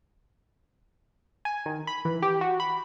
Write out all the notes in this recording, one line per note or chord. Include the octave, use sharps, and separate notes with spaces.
G#5
D#3
B5
E3
G4
F#4
B5